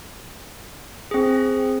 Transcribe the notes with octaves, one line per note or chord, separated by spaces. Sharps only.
C4 G#4